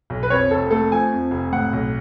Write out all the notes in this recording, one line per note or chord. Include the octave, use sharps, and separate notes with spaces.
B1
B4
F2 C#5
F1 A4
A3 A4
F3 G#5
F2
F1
A2 F#5
B1